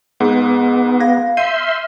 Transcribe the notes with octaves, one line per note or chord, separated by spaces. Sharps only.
G#2 B3 G#4
F5 G#6 A#6
E5 C6 G6 C7 D#7
F6